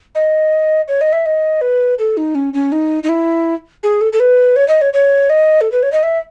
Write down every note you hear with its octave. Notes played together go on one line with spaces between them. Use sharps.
D#5
C#5
D#5
E5
D#5
B4
A4
D#4
C#4
C#4
D#4
D#4
E4
G#4
A4
A4
B4
C#5
D#5
C#5
C#5
D#5
A4
B4
C#5
D#5
E5